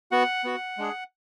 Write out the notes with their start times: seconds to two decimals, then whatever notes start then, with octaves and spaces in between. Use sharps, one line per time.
0.12 B3 F#4 F#5
0.44 B3 F#4
0.78 G#3 D4 G#4